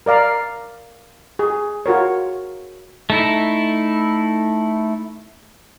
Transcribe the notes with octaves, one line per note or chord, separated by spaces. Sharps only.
A#4 D5 F5 A#5
G#4
F4 F#4 A#4 C#5
A3 D#4 E4